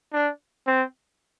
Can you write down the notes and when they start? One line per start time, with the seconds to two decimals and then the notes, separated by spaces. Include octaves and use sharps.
0.13 D4
0.67 C4